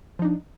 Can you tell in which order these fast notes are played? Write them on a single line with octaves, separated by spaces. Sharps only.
F3 D#4 D4